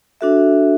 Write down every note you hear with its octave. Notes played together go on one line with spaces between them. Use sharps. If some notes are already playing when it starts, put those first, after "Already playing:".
D4 F#4 A4 E5